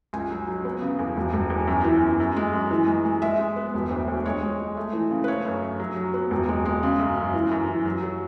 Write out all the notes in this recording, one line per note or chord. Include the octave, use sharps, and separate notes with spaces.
C#2 G#5
F#3
F#3
B3
C#3
E2
E1
E1
E2
F#2
E3
F#2
F#2
G#3
F#2
E3
G#3
G#3
G#3 E5
G#3
B3
E1
D2
D2
G#3 C#5
G#3
G#3
A3
E3
C#3
B4
A3 C#5
F#2
F#2
F#3
F#3
B3
E1
G#3
G#3
C#3
F#2
F#2
E3
F#2
E3
F#3
F#3